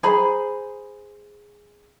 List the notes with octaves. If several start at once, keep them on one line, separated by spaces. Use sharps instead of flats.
G#4 C5 A#5 B5